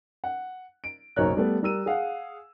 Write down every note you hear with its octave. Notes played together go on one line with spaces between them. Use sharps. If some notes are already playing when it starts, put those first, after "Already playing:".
F#5
D7
F#1 B1 D#4 A#4 C#5 F#6
G3 A3 B3
G3 A#4 E6 D#7
G#4 F5 F#5